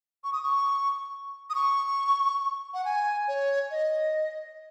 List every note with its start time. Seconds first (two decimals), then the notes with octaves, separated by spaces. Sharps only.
0.24 C#6
0.33 D#6
0.43 C#6
1.50 D#6
1.55 C#6
2.74 F#5
2.85 G#5
3.28 C#5
3.71 D#5